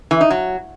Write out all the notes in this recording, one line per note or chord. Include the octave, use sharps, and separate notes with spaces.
E3
D#4
F#3